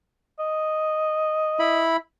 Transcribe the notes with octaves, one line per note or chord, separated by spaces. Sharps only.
D#5
E4 B5